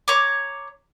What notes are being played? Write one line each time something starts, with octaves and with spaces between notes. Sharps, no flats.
C#5 A#5 D6